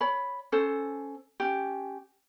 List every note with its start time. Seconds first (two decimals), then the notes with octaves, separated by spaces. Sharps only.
0.01 C#5 B5
0.52 C#4 A4 C5
1.40 C#4 G4